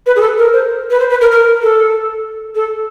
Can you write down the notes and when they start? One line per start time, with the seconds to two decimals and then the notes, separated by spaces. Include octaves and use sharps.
0.06 B4
0.16 G#4
0.21 A4
0.38 A#4
0.53 C5
0.91 B4
1.00 C5
1.10 B4
1.21 A#4
1.32 A#4
1.63 A4
2.55 A4